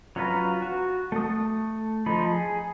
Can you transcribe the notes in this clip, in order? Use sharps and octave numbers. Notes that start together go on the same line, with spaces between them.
F#3 C#4 F4 B4 A#5
F#4
A3 D#6
F3 D#4 B5
G#4